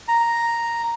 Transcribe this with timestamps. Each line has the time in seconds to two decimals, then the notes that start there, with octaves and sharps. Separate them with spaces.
0.08 A#5